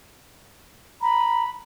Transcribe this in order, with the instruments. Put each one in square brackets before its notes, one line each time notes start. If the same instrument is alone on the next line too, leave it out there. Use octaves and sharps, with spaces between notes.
[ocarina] A#5 [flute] B5